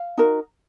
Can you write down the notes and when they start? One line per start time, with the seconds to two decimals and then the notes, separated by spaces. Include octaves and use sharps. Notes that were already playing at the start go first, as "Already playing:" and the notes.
Already playing: F5
0.17 D#4 F#4 A#4